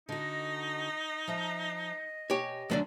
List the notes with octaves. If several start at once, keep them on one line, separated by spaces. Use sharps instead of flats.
D3 D#4 F#4 D#5
F3 E5 A#5
B2 G4 C#5 G#5
D2 D3 F#3 A3 C#4 D4